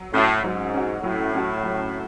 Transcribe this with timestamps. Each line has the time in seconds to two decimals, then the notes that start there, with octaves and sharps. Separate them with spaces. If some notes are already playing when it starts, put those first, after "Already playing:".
Already playing: F#3
0.13 A2 C#4 F#4
0.43 G#2 F#3
0.74 C#4 F#4
1.03 A2 F#3
1.33 C#4 F#4
1.63 F#3